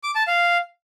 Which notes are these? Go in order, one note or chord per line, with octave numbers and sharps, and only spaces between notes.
D6
A5
F5